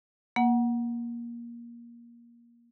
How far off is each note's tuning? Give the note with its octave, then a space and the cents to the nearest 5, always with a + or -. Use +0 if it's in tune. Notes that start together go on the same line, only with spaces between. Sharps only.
A#3 +20 F#5 +0